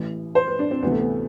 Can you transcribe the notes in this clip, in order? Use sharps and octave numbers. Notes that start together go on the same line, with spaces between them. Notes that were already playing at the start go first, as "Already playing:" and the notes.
Already playing: A1 A2 E3
C5
B4
D4
C4
D2 C3 E3 B3
A3
B3